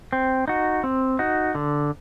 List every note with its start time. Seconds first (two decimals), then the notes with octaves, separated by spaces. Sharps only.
0.13 C4
0.48 D#4 F#4
0.84 C4
1.19 D#4 F#4
1.55 D3